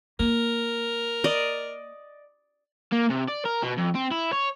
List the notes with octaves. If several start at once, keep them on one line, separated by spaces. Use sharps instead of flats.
A#3 A#4
D5 D#5
A#3
C3
D5
A#4
B2
F2
C4
E4
C#5